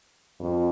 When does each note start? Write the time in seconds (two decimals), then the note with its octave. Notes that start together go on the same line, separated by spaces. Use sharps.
0.40 F2